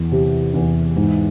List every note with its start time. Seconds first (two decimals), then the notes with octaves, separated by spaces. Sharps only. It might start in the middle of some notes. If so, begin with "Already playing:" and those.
Already playing: E2
0.12 C3
0.54 E2
0.96 G#2